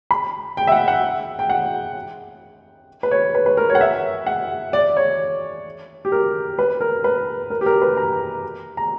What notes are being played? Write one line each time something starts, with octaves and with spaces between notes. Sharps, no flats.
B5
G5
E5
F#5
F#5
G5
F#5
B4
C#5
B4
B4
A#4
C#5
F#5
E5
F#5
D5
C#5
G4
A#4
B4
A#4
B4
A#4
G4
A#4
B4
A#5
A#5